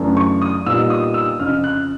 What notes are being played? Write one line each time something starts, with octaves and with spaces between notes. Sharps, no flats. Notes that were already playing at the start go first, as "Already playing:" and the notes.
Already playing: F#2 C#3 E3 A3 D4
C#6
D#6
A#2 G3 B3 D#4 E6
D#6
E6
F2 C#3 F3 F6
F#6